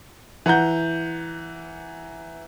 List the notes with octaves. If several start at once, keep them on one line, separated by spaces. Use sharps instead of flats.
E3 F#5 A#5 G6